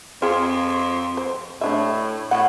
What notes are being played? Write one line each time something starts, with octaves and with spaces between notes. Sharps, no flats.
F2 C4 F4 G#4
C5
A2 A3 D4 E5
A2 F#5